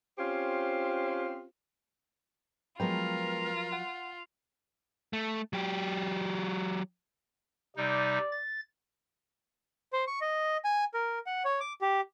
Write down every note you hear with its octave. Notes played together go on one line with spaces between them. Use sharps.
C4 C#4 F4 G4 C5
F3 F#3 G#3 B3 F4 A#4 B4 G5
F#5
A3
F#3 G4
C3 G3 D#4 D5
A6
C5
C#6
D#5
G#5
A#4
F#5
C#5
D6
G4